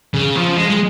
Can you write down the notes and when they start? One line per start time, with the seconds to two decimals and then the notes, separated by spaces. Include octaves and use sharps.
0.14 C#3
0.36 F3
0.56 G#3
0.69 G#3